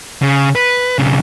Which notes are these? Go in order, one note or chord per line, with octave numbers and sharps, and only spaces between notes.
C#3
B4
B1 C#3